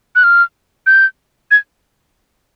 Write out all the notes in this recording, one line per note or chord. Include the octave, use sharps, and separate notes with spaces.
F#6
F6
G6
G#6